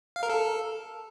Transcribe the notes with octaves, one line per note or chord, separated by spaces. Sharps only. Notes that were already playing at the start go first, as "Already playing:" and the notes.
F5
A#4
A4